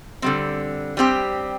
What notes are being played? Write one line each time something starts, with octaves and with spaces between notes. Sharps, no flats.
D3 G3 C4
G3 C4 G4